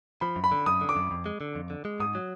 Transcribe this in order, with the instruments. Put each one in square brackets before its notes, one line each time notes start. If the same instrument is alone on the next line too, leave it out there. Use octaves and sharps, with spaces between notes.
[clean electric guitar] F3 [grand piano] B5
[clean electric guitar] F#2
[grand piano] B5
[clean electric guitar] D3
[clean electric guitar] F#2 [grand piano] D#6
[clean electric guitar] D3
[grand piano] D6
[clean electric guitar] F#2
F2
G#3
D3
F2
D3
G#3
[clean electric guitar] G#2 [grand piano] D#6
[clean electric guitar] F#3